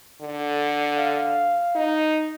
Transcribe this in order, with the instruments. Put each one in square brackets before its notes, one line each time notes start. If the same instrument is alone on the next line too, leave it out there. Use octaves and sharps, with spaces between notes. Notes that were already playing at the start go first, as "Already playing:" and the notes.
[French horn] D3
[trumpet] F5
[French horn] D#4